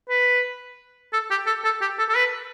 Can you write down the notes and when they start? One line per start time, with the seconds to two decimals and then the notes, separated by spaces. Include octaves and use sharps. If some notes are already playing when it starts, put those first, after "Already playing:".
0.09 B4
1.13 A4
1.31 G4
1.47 A4
1.64 A4
1.81 G4
1.99 A4
2.09 A4
2.16 B4